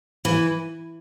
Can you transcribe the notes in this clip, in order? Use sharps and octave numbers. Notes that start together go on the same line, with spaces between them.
E3